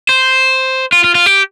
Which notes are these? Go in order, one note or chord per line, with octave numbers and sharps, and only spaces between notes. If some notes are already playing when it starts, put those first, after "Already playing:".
C5
F4
F4
F4
G4